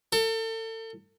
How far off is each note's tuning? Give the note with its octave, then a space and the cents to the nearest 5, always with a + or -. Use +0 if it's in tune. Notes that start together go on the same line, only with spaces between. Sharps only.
A4 +35